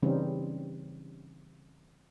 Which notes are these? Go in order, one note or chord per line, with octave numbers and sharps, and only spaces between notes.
C#3 E3 G3 C4 C#4 D#4